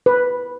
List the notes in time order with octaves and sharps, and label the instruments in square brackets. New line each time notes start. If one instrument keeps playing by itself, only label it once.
[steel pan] B4